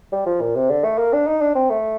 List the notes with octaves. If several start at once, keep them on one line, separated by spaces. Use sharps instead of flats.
G3
F3
A#2
C3
D3
A3
A#3
D4
D#4
D4
C4
A3